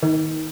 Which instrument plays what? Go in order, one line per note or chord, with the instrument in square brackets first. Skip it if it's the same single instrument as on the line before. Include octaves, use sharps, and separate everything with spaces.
[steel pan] D#3